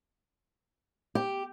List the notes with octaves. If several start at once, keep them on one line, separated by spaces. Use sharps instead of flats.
G4